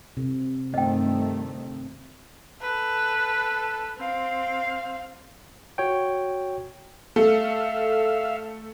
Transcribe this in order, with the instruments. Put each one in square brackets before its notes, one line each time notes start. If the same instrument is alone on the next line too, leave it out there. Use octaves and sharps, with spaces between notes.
[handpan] C3
[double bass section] G2 D#3 A3 [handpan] C4 [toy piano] D#5 G5
[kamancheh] A4 B4
C4 F5
[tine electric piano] F#4 C#5 G5
[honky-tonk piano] A3 [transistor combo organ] E5 F5